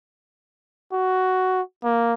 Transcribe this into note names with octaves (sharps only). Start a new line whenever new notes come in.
F#4
A#3